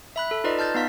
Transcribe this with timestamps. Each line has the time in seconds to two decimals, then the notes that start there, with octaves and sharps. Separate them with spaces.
0.16 E5 B5 F#6
0.31 A4
0.44 D#4 F4 B4 D5 D#5
0.58 D#5 A5 F6 G6 A6
0.75 B3 D#4 F5 B6